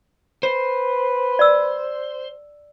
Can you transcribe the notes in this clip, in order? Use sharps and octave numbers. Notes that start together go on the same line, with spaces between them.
B4 C5
D5 E6